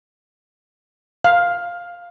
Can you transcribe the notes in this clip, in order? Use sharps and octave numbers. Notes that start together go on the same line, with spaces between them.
F5